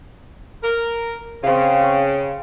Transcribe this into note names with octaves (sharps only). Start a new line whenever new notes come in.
A#4
C#3 C4 F5
C#6